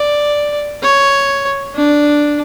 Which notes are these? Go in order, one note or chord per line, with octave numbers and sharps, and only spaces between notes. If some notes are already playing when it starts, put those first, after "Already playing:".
Already playing: D5
C#5
D4